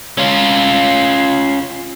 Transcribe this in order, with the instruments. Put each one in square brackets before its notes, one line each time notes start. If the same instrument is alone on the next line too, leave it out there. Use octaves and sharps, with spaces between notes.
[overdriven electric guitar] C#4 F4